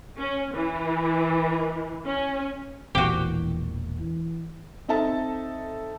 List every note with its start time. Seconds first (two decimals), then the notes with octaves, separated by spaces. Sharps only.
0.17 C#4
0.53 E3
2.05 C#4
2.95 E1 A#1 A#2 E3 F#4 G4
3.99 E3
4.88 C4 D#4 A4 E5 A5